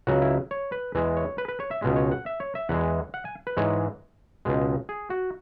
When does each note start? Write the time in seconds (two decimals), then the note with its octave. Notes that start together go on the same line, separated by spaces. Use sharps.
0.07 C#2 C#3 F#3 F#4
0.22 E4
0.51 C#5
0.72 B4
0.95 E2 E3 G#3
1.17 C#5
1.38 B4
1.48 B4
1.60 C#5
1.71 E5
1.82 C#2 B2 G#3
1.96 C#5
2.11 F#5
2.26 E5
2.40 C#5
2.55 E5
2.69 E2 E3 G#3 F#5
3.14 F#5
3.25 G#5
3.47 B4
3.57 G#2 E3 G#3 C#5
4.45 C#2 B2 G#3
4.89 G#4
5.10 F#4